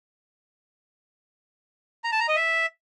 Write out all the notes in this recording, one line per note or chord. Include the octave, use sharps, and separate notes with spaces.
A#5
A5
A#5
D#5
E5